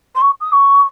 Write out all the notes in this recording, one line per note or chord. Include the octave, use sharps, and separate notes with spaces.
C6
C#6
D#6
C#6